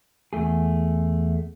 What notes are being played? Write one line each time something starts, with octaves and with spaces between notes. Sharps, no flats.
E2 G2 A3 G#4